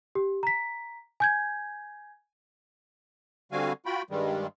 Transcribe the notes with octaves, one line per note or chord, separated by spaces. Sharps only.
G4
A#5 B6
G#5 G6 G#6
D3 G3 C4 F#4 F5 G#5
F4 F#4 G5 B5
G2 D#3 G3 G#3